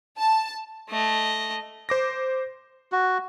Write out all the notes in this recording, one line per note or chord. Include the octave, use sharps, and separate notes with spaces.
A5
A3 D#5
C5 D6 A#6
F#4